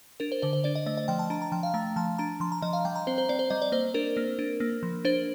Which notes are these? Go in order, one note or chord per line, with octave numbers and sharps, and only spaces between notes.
D4 A#4
C5
D3 C5
C5
D4 D5
D#5
A3 D#5
D#5
F3 G5
A5
D4 A#5
A#5
F3 G5
F5
A3 A#5
F3 A5
D4 A#5
F3 C6
A#5
F3 D#5
F5
G3 G5
A#5
C4 C5
C5
C4 D5
C5
G3 D#5
D5
A#3 C5
D4 A#4
A#3
D4
A#3
F3
D4 C5